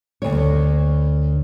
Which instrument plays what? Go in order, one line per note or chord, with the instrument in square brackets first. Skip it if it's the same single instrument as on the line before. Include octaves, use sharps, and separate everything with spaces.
[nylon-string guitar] D2 C#5